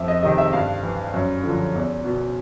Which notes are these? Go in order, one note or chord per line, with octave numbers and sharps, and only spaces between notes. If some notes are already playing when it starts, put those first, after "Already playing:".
Already playing: F2 E5
D#5
C3 D#3 D#5
E5
G2 F5
E3
F#2
D3 F3
E2
B2